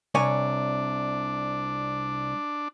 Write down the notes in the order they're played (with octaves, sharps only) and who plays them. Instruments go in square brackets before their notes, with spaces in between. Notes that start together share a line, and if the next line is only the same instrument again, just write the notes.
[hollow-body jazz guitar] C2 C#5 G#5 [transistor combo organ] D4